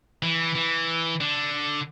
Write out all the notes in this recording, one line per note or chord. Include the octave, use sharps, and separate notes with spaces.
E3
E3
D3